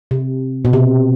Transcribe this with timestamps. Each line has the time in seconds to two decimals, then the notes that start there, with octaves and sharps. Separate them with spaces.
0.11 C3
0.65 B2
0.73 C3